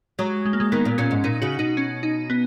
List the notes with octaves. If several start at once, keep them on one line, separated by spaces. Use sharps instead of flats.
F#3 G#3
G#3
A#3
G#3
D#3 B3
A#2
A#2 C#4
G#2
A#2 D#4
C#3 F#4
B2 D#4
C#4
D#4
B3